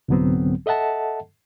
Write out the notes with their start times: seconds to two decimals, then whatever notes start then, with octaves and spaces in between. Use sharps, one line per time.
0.08 C2 G#2 D3 F#3 B3 C4
0.66 A4 D#5 E5 F#5 A5